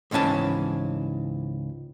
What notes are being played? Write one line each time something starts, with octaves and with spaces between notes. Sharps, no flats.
C#2 G#2 E3 C#4 A5